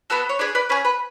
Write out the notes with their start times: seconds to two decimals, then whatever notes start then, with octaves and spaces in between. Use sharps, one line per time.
0.10 B3 F#4 A4 B4
0.29 C#5
0.39 D4 G#4 B4 D5
0.55 B4 D5
0.69 C#4 G#4 B4
0.85 B4